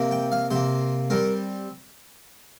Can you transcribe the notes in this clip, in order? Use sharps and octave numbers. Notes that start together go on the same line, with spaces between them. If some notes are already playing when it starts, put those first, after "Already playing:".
Already playing: C3 A#3
G5
F5
C3 A#3 C5
G3 C4 A#4